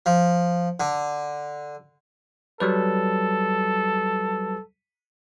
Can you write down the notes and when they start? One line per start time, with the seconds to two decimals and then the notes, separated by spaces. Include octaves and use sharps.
0.06 F3
0.80 D3
2.60 F#3 G3 A4 B4